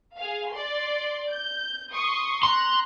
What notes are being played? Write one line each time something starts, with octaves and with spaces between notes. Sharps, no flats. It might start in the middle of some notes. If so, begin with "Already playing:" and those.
G#4 F5
D5 C6
G6
C6 C#6 D#6
A#5 C6 F#6